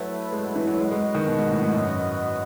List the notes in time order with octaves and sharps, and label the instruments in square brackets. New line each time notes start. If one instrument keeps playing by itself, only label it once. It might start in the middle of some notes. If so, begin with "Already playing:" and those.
Already playing: [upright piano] F#3 [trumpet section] A3 E4 B4
[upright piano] G#3
F#3
E3
F#3
[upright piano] G#3 [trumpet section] F#4 B4 D#5 F#5
[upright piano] G#3
D#3
B2
G#2
A2
G#2
F#2